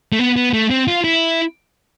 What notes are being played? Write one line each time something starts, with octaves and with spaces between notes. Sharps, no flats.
A3
B3
B3
A3
C4
F4
E4